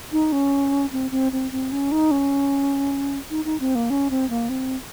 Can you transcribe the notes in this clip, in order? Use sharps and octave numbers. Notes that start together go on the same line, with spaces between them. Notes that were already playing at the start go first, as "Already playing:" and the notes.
D#4
C#4
C4
C4
C4
C4
C#4
D#4
C#4
D#4
D#4
C4
A#3
C#4
C4
A#3
C4